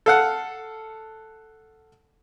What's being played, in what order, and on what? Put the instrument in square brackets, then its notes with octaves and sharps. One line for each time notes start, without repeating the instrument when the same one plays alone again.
[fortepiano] A4 F5 F#5